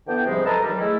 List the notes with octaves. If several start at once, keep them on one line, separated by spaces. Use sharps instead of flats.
D3 E3 B3 G5
G#2 C3 F3 G3 G#3
A4 B4 D#5 A5 A#5
G2 D#3 E3 F#3 G3
G#3 A3 E4